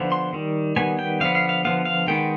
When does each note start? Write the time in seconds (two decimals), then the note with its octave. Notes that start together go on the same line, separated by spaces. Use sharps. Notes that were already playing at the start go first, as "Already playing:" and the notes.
Already playing: D3 F3 B3
0.12 C6
0.33 D#3 G3
0.76 D#3 G3 B3 G#5
0.99 G5
1.20 D3 F3 B3 F5
1.35 F5
1.49 F5
1.65 D3 F3 B3 F5
1.85 F5
2.07 D#3 G#3 B3 G5